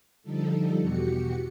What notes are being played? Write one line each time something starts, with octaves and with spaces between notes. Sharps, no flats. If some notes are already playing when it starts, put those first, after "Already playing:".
D3 F3 G3 D#4 A4
E2 B2 F#4 G4 C#7